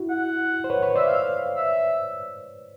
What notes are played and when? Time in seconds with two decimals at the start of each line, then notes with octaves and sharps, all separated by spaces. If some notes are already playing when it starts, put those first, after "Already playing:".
Already playing: E4 F#4
0.09 F#5
0.64 C5
0.70 B4 C#5
0.82 B4 C#5
0.95 C5 D5 E5
1.07 F5
1.56 E5